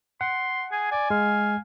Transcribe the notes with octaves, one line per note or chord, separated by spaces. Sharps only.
F#5 C6
G#4 G#5
D5 G#5
G#3 F5